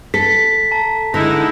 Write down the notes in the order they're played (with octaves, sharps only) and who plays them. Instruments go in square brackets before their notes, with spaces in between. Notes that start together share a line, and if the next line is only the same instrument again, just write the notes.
[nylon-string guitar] A4 [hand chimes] B6
[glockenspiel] A5 A#5
[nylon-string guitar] D3 [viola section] G#3 D#4 E4 [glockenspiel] A#6